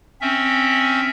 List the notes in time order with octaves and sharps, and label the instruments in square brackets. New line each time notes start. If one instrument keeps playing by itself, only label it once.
[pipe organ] C4 C#4 E5